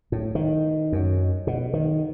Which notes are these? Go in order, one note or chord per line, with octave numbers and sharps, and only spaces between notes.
A2
D#3
F#2
B2
D#3